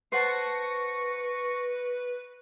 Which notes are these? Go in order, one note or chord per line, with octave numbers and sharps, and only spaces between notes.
B4 C5 F#5 A5 C#6 A#6 C#7